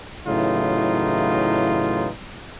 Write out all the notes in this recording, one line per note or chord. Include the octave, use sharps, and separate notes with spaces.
A2 C#3 E3 F#3 D#4 F4